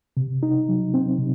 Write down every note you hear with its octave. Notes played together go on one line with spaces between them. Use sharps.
C3
D#4
F#3
C4
C3